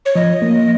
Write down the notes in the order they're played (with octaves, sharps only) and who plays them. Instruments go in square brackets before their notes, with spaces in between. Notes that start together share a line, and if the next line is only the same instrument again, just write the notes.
[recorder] C#5
[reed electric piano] F3 [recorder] D#5
[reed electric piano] A#3